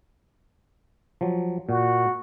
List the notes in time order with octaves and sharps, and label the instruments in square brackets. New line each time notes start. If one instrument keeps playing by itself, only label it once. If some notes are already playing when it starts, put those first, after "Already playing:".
[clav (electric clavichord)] F3 F#3
[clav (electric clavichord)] A#2 [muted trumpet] F#4